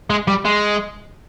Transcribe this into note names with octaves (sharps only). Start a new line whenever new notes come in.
G#3
G3
G#3